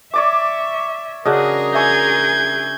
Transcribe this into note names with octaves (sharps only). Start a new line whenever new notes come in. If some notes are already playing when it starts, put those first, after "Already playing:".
C#5 D5 E5 D6
C#3 D4 F#4 G#4 A#4 D#5
E5 G#5 C#6 G6 G#6